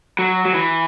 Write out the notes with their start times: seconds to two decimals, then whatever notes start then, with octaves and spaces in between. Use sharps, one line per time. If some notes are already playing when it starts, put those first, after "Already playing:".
0.19 F#3
0.45 F#3
0.55 E3